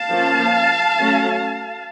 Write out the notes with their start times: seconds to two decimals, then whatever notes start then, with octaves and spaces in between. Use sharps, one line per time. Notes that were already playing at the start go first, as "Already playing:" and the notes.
Already playing: F5 A5
0.11 F3 A#3 C#4
0.97 F#3 A3 C#4